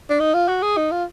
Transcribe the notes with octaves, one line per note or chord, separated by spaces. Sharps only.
D4
D#4
F4
F#4
G#4
D#4
F4